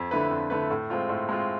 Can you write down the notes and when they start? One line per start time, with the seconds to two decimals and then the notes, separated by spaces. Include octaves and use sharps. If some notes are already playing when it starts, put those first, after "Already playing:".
Already playing: F2
0.11 D3 A3 E4 B4
0.31 F2
0.50 D3 A3 E4 B4
0.70 A2
0.90 G#3 C4 F4
1.09 A2
1.29 G#3 C4 F4